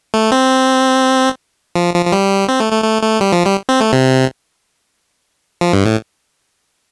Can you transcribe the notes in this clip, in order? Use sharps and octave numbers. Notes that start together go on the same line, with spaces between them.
A3
C4
F3
F3
F3
G3
C4
A3
A3
A3
A3
G3
F3
G3
C4
A3
C3
F3
G2
A2